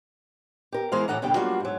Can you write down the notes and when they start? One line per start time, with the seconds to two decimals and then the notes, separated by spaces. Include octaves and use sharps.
0.72 G4 A#4
0.92 E2 E3 G#3 A#4 C5 F5
1.08 A2 E3 A4 F#5 A#5
1.22 E2 G2 B2 D3 G3 G5
1.35 F#3 G3 A#3 D4 F4 F#4
1.60 G#2 F#3